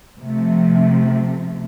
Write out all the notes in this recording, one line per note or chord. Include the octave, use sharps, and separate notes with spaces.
C3 F3 A3